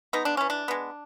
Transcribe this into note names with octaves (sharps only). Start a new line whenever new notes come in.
G#3 B3 D#4
D4
E3 C#4
D4
G#3 B3